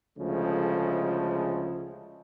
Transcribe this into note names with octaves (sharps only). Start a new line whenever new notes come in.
D2 C#3 F3 G#3 A3